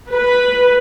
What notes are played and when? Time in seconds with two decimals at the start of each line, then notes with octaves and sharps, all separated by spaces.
0.12 B4